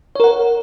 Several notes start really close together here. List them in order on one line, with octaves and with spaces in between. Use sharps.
C#5 A#4 F#5